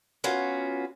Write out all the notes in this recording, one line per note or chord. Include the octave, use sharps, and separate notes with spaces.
B3 C#4 F4 F#4